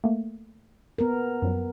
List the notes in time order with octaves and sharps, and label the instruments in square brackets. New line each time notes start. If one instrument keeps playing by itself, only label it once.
[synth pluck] A3 A#3
[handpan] B3 A#4
[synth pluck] F#2 F3 F#3